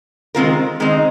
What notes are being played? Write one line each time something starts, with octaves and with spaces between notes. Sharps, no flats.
D#3 G#3 C4 F4 A#4
D#3 G#3 C4 D#4